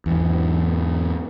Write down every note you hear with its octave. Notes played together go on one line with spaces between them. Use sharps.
E2 G#2